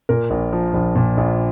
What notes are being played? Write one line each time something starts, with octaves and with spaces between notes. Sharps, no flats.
A#2 A#4
A#1
F3
A#1
A#2
A#1